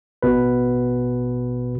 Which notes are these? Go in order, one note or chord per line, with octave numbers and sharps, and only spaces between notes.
A1 B2 B4